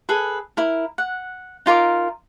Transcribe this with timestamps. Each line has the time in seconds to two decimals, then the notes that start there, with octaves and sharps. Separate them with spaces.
0.09 G#4 A4 B4
0.57 E4 A#4
0.98 F#5
1.66 D#4 F4 A#4 D6